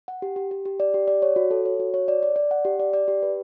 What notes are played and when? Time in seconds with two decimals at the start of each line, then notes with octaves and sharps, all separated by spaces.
0.08 F#5
0.22 G4
0.36 G4
0.51 G4
0.65 G4
0.80 D5
0.94 G4
1.08 D5
1.22 C#5
1.36 F#4
1.51 A4
1.65 C#5
1.80 F#4
1.94 C#5
2.08 D5
2.23 D5
2.36 D5
2.51 F#5
2.65 G4
2.80 D5
2.93 D5
3.08 G4
3.23 B4